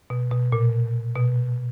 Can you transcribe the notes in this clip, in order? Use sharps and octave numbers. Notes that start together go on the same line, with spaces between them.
B2
B2
A#2
B2